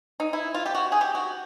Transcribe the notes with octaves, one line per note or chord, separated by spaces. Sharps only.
D#4
E4
F4
G4
F#4
G#4
G4
F#4